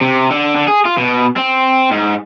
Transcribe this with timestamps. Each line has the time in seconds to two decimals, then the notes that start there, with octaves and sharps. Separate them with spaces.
0.01 C3
0.31 D3
0.56 D3
0.68 G#4
0.86 F4
0.98 B2
1.37 C4
1.91 G#2